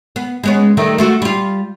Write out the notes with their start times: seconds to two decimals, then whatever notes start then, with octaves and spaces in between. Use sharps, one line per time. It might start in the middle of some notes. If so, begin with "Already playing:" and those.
0.16 B3
0.43 G#3 B3 C#4
0.77 D#3 G3 A3
0.98 A3 F4 F#4
1.22 G3 F4